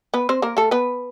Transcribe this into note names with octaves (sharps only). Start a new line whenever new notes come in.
B3 B4
C4 C5
A#3 A#4
A3 A4
B3 B4